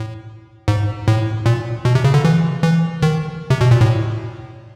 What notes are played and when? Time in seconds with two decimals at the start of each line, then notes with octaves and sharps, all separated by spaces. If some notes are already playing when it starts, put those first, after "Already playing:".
Already playing: A2
0.68 G#2
1.08 A2
1.46 A#2
1.85 B2
1.95 C3
2.04 C#3
2.14 D3
2.25 E3
2.63 E3
3.03 D#3
3.50 C3
3.61 B2
3.71 A#2
3.81 A2